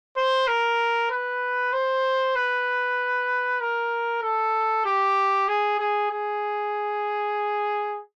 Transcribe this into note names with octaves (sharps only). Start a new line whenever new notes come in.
C5
A#4
B4
C5
B4
A#4
A4
G4
G#4
G#4
G#4